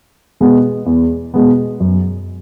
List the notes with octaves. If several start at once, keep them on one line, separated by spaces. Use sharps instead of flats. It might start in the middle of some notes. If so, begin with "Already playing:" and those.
B2 G#3 B3
E2
B2 G#3 B3
F#2